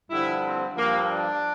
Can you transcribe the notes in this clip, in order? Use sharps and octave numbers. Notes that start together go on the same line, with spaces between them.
G2 D3 F3 E4
C4
G2 F3 A#3
D4